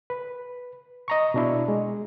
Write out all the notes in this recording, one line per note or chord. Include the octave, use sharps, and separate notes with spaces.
B4
D#5 A#5 C#6
B2 D4 E4
G#3